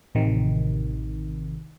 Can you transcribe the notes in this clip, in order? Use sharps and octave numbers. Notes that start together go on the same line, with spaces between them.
A1 C3 D#3